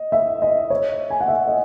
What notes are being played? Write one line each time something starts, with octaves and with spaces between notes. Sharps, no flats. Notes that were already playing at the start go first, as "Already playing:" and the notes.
Already playing: D#5
E5
D#5
C#5
G#5
F#5
E5
D#5